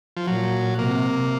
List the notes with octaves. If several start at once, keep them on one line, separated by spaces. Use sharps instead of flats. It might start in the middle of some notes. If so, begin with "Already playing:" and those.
F3
A#2 F#3
C3 A#3